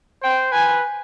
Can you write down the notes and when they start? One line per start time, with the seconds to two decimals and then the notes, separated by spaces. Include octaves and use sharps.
0.23 C5 G5
0.52 B4 G#5